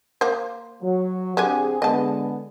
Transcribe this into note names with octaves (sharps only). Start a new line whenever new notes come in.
A#3 C5
F#3
D3 C4 D4 G4 G#4 G#5
D3 G#3 B3 D#5 A5